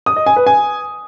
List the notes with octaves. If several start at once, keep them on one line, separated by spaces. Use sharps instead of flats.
D#6
D#5
G#5
B4
G#5